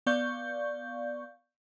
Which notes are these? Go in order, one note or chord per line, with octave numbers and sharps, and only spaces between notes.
B3 D5 F5 C#6 G6